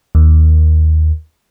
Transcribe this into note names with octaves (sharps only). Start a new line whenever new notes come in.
D#2